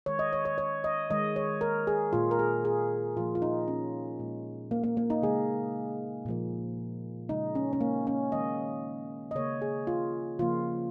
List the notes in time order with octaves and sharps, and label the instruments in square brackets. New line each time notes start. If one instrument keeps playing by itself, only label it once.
[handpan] D#3 G#3 C#5
D#5
C#5
C#5
C#5
D#5
D#3 G#3 D#5
C#5
A#4
G#4
A#2 A#3 F4
A#4
G#4
G#4
A#2 F3 A#3 F4
F4
D#4
C#4
A#2 G#3
A#3
A#3
A#3
D#4
C#3 G#3 G#4
A#2 F3 A#3
C#3 G#3 D#4
C#4
C#4
A#3
C#4
D#3 G#3 D#5
D#5
C#3 A#3 C#5
G#4
F4
C#3 F3 A#3 F4